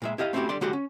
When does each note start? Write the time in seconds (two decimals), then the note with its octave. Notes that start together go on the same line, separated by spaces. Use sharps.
0.02 A#2 G#3 E5
0.18 E4 G4 D#5 F5
0.33 A3 C4 C#4 E4 F#4 G4
0.49 D3 G3 D5 C6
0.61 D3 G#3 F#4 G4 C6
0.73 C#4